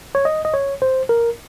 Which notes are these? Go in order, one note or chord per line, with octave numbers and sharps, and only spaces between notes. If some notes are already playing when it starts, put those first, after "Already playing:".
C#5
D#5
D#5
C#5
C5
A#4